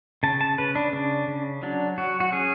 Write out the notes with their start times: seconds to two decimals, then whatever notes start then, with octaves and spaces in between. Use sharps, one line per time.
0.23 C#3 A5
0.41 A5
0.58 C#3 B4
0.75 D4
0.93 C#3 D4
1.28 C#3
1.63 F#3 D4
1.98 F#3 F#4
2.20 F#4
2.32 C#4 G#4